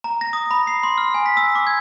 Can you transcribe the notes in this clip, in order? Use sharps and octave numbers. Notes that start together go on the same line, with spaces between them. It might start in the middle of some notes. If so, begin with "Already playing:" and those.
A#5
A#6
D#6
B5
C7
C6
F6
G#5
B6
E6
D6
G#6